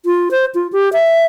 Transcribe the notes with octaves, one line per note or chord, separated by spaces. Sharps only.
F4
C5
F4
G4
E5